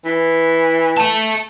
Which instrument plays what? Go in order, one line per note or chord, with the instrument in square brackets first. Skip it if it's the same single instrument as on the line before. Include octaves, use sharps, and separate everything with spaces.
[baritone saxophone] E3
[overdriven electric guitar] E5 A5